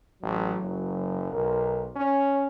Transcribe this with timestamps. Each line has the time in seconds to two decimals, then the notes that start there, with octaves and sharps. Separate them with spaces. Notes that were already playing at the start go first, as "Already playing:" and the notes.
0.23 A1 F#3
0.62 F#1
1.32 B1 A#4
1.96 C#4 C#5